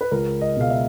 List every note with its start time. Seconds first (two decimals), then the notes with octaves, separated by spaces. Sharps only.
0.01 B4
0.11 C#2 A#4
0.41 D#5
0.56 B2 G#3 F5
0.70 E5